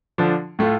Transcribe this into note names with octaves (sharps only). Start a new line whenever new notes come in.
D3 F3 D4
A2 A3 F4